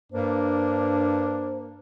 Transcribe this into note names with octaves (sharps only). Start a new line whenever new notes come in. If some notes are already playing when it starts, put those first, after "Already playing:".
G2 A#3 D4 C5